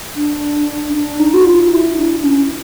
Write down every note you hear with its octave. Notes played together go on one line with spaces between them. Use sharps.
D4
D4
D#4
F#4
F4
E4
D4
C#4